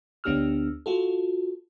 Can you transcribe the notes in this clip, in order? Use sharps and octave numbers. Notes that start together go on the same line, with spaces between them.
D2 B3 D4 G4 E6 F6
F4 F#4 A4